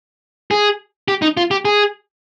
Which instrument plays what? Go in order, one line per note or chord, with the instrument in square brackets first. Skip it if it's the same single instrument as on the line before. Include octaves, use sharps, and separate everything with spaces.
[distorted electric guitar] G#4
G4
D#4
F4
G4
G#4